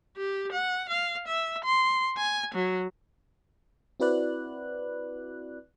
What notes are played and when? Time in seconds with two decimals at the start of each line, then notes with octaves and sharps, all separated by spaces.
0.17 G4
0.52 F#5
0.89 F5
1.28 E5
1.64 C6
2.18 G#5
2.54 F#3
4.00 C4 E4 F#4 B4 D5 F#6